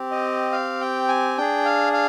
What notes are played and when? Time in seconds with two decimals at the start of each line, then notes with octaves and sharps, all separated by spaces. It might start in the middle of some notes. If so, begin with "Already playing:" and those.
Already playing: C4 G4
0.11 D#5
0.52 F5
0.81 G5
1.08 G#5
1.38 D4 G#4 G5
1.65 F5
1.93 F5